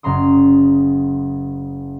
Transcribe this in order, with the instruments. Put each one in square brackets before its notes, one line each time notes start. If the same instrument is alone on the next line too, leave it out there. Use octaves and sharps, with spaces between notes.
[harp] F#1 C#4 A#5 C6 D#6